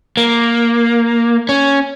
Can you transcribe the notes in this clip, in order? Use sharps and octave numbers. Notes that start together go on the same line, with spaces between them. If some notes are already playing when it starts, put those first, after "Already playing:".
A#3
C#4